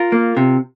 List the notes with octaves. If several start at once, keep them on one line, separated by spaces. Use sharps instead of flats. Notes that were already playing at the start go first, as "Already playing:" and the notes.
Already playing: F4 A#4
A#3
C3